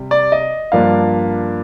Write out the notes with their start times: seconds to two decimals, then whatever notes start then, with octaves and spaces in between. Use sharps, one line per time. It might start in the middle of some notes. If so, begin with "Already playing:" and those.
Already playing: C3 G3
0.11 D5
0.32 D#5
0.72 G2 F3 A#3 D4 F5